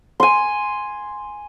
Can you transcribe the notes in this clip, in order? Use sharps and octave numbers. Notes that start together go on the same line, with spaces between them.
G#5 C6